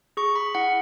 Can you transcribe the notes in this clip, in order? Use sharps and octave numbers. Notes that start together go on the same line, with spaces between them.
G#4 C#6
B5
E4 F#5